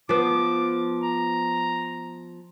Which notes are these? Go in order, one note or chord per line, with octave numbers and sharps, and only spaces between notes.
F3 B3 D6
A#5